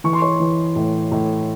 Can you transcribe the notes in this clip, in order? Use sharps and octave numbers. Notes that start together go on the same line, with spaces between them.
E3 C#6
C6
C#5 C#6
E3
A2
A2